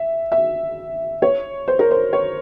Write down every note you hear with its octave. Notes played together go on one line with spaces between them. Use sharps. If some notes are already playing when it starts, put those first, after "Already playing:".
Already playing: E5
E5
C#5
C5
A#4
C5
C#5